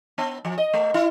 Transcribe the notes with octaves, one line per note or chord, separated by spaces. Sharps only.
B3
F3
D#5
A3
E4